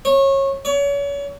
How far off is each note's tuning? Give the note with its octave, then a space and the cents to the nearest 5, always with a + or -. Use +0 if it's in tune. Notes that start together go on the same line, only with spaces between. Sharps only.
C#5 -25
C#5 +35